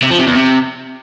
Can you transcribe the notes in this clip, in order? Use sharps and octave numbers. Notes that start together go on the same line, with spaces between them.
C3
F3
C3
E2
C3